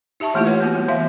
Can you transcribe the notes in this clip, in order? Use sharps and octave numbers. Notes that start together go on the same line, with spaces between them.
D#4 G4 E5 A5 C#6
E3 A3 A#3 E4 F4 G4
B4 C#5 F#5
A#3 B3 F#4
G3 A#3
E3 B3 E5 F5